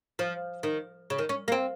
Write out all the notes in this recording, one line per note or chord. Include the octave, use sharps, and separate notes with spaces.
F3
D#3
C#3
D#3
C#4
A#3
C4